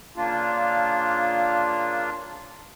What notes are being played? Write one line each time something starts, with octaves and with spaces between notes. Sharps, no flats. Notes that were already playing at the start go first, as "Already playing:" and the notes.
C#3 A#3 D4 F4